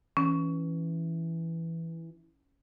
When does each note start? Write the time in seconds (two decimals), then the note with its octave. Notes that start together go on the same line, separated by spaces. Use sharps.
0.17 E3 C#4